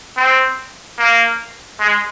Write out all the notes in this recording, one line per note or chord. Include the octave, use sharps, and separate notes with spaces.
C4
A#3
G#3